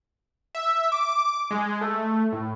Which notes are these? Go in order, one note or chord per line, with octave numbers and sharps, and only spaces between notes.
E5
D6
G#3
A3
A2